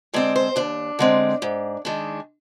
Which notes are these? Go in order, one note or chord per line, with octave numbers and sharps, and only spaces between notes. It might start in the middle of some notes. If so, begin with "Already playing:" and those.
D3 G#3 C4 D5
C5
D#2 D4
D3 G#3 C4
G#2
D#3 G#3 D4